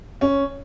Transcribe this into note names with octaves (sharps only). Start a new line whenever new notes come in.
C#4